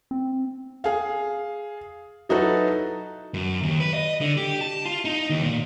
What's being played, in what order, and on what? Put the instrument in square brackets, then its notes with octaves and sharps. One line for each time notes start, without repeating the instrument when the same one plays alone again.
[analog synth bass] C4
[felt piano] G#4 F5
F#3 D#4 E4 F#4 A4 B4
[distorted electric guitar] F#2
D#2
B4
D#5
D3
G4
A5
F4
D#4
D#2
A#2